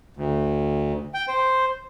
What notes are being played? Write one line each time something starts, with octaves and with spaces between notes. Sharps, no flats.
D2
G5
C5